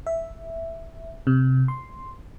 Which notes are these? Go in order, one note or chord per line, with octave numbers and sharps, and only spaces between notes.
E5
C3
C6